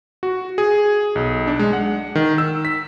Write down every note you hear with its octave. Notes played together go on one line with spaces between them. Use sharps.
F#4
G#4
B1
D4
G#3
F#5
D#3
E6
B6